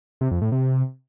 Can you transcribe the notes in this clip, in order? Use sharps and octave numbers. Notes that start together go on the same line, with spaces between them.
C3
F2
A2
C3